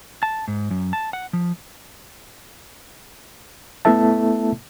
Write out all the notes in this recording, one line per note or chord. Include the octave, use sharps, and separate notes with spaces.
A5
G#2
F#2
A5
F#5
F3
A3 B3 E4 A4 E5 A5